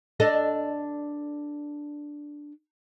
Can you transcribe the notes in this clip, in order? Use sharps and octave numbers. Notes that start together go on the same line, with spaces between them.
D4 A4 D#5